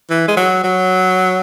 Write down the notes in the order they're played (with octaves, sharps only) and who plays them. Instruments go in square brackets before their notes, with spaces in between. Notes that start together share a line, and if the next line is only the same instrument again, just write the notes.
[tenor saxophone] E3
G#3
F#3
F#3